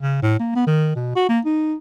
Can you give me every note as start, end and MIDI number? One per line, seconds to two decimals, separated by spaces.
0.02 0.19 49
0.23 0.36 45
0.40 0.54 58
0.56 0.66 59
0.67 0.94 51
0.96 1.14 47
1.16 1.27 66
1.29 1.40 58
1.45 1.74 63